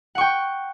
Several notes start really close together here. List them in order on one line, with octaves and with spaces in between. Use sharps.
F#5 C#6 G5